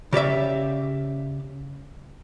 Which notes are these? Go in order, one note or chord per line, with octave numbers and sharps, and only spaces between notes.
C#3 G4 D5 E5